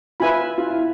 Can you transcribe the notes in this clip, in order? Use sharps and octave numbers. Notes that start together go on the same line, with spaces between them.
F4 B4 E5 G#5 B5
F4
E4